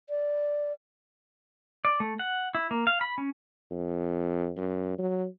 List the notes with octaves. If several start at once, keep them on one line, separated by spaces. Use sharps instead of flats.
D5
D5
A3
F#5
E4
A#3
F5
B5
C#4
F2
F#2
F#3